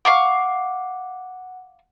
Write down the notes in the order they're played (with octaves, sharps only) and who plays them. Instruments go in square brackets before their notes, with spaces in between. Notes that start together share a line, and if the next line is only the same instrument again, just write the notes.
[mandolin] F5 C#6 D6 [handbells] F#5